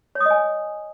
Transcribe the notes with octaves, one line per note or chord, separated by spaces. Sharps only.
C#5
D#6
D#5
G#5